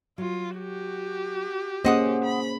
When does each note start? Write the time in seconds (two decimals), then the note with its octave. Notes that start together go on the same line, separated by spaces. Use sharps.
0.18 F#3 F4
0.57 F#4 G4
1.85 A#3 C#4 G#4 C5 D#5 F#5 D#6
2.25 B5